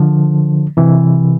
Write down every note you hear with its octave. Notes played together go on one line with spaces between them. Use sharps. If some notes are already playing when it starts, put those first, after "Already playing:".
Already playing: D3 F3
C3 E3